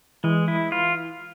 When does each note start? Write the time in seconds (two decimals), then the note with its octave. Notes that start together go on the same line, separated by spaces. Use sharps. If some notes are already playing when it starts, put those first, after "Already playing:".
0.24 E3 G#3
0.48 E4
0.72 F4